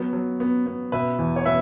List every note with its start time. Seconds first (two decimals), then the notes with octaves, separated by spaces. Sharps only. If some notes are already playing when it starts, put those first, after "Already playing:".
Already playing: F#3 B3
0.13 F#3
0.40 B3
0.66 B3
0.92 B2 B4 E5
1.19 E2
1.36 C#5
1.45 B2 B4 E5